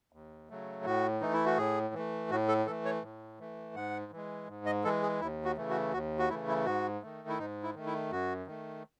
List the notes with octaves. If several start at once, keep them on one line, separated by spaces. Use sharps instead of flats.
D#2
C#3 F#3 A3
A2 F#4
E3 A3 D#4
E4
F#4
A2 G#4
E3 A3
A2 F#4
A4
E3 A3 A4
C#5
A2
E3 A3
G#2 F#5
E3 G#3
G#2
D#5
E3 G#3 A4
G#4
D#2 E4
F#4
C#3 E3 A3
F#4
D#2 F#4
F#4
C#3 E3 A3 E4
E4
G#2 F#4
D#3 A3
E4
G#2 D#4
E4
D#3 A3
E4
F#2 F#4
D#3 A3